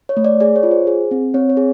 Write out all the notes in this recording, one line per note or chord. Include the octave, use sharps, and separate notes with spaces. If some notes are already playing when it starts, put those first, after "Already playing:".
C#5
A3
D5
G#4 D5
C#5
F4
C5
G#4
C4
C4 C#5
C#5
G#4